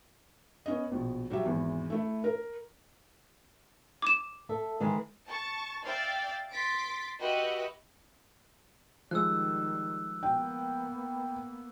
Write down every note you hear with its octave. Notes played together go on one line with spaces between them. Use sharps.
B3 C#4 D#5
A#1 B2
F#3 G3 G4 E5
G#1 E2 E3
A3 E4 A4
A#4
D6 E7
A4 E5
D#3 E3 G#3
A5 C#6 A6
D5 E5 F5 G5 A6
C6 A6 B6 D7
F#4 G4 B4 D#5 E5 F#5
D#3 F3 G3 G#3 E6 F#6
A#3 B3 G5